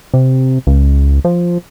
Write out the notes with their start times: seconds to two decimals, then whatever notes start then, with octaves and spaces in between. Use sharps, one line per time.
0.14 C3
0.67 C#2
1.25 F3